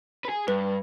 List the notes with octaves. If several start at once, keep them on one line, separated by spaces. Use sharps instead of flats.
G#4 B4
G2 B4